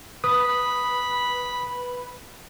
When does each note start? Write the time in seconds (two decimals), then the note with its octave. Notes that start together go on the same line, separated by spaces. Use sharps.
0.24 B4 B5 D#6